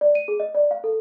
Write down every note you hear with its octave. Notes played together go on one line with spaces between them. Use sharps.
D5
D#7
G#4
D#5
D5
F5
A4